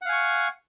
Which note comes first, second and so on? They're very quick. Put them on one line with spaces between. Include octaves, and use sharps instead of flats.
F#5 F5 G#5 C#6